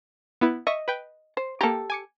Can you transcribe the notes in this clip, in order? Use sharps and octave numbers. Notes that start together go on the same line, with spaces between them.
B3 E4 B4
D#5 E5 C#6
B4 G5
C5
A#3 G4 A4 A#5
G#5 D6 C#7